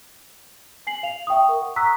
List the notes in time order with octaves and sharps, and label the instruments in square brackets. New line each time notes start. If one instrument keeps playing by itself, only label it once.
[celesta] G#5 C7 F#7
F5 F7
E5 G5 C#6 D#6
A#4 C#6
F#5
A#5 C#6 D#6 E6 F#6 B6